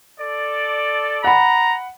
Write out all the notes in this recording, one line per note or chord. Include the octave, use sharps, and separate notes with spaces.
A4 D5
F#5 A#5 B5